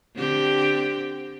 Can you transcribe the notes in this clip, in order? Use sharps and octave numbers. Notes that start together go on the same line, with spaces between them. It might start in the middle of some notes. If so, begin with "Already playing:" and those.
D3 C4 G4